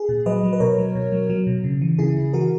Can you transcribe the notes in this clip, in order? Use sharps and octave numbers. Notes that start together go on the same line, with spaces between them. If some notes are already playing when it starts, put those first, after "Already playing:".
Already playing: G#4
A#2
F#3 B4 D#5
F#3
B4
B2 A#4 C#5
F#3
B2
F#3
F#3
B2
C#3
E3
C#3 E4 G#4
C#3
E3 F#4 A#4